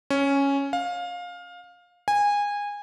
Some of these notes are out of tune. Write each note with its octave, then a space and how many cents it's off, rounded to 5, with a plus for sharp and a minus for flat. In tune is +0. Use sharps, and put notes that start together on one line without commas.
C#4 +0
F5 +20
G#5 -20